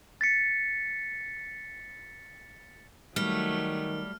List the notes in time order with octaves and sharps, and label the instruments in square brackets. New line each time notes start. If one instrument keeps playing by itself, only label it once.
[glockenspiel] A6 B6 C#7
[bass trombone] D#3 [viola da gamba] F#3 A3 [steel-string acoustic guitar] G3 [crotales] F6